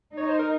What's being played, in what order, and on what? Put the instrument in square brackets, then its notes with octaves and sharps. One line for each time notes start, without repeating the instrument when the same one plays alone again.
[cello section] D#4 [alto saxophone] C#5
[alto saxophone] C5
A#4